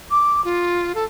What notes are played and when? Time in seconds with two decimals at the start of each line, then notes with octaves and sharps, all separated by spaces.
0.11 D6
0.44 F4
0.95 A4